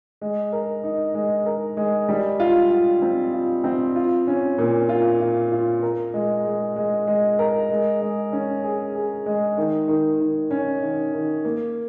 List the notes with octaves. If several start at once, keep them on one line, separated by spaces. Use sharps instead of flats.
G#3
A#4
D#4
G#3
A#4
G#3
G3
F4
F4
C4
F4
C4
F4
C#4
A#2
F4
F4
F4
A#4
G#3
G#3
G#3
G#3
A#4
G#3
G#3
C#4
G#4
G#4
G#3
D#3
D#3
D#3
C#4
D#3
D#3
A#3